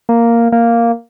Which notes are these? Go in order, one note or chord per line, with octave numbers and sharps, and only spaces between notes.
A#3
A#3